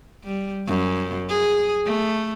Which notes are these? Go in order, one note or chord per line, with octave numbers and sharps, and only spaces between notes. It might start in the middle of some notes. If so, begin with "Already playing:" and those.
G3
F#2
G#4
A3